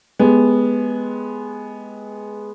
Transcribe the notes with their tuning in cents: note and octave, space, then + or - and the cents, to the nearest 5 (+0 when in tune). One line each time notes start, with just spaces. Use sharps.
G#3 +15 B3 +0 G4 +25